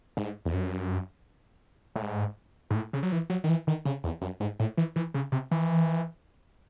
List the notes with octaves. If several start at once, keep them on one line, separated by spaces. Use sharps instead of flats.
G#2
E2
F#2
A2
G#2
G#2
A2
C#3
F#3
E3
F#3
D#3
E3
D#3
C#3
E2
F#2
G#2
A2
E3
E3
C#3
C3
E3